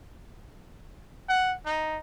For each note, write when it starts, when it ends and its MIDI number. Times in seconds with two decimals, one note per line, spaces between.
1.28 1.53 78
1.65 1.98 63